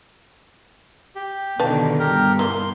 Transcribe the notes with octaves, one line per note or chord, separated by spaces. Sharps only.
G4
B2 D3 D#3 B4 F5 A5
G2 B3 G4 A#4
E3 A#3 C6